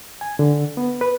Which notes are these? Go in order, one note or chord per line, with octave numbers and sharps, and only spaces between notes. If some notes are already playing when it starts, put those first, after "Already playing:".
G#5
D3
B3
B4